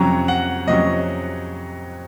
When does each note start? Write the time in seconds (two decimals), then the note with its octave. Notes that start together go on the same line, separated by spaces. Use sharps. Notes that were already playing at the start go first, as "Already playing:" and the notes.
Already playing: F2 C3 F#3 C#4 A#5
0.28 F#5
0.67 F2 C3 F#3 C#4 D#5